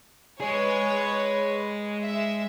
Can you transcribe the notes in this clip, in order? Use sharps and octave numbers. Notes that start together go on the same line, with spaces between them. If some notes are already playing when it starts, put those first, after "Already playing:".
G#3 G#4 B4 C#5
E5